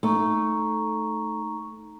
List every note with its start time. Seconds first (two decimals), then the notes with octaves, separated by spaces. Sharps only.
0.03 A3 D#4 A#5 C#6